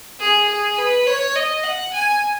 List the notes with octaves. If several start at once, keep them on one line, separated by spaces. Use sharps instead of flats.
G#4
G#4
B4
C#5
D#5
F#5
G#5